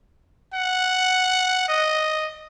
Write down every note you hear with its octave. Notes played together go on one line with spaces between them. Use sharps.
F#5
D#5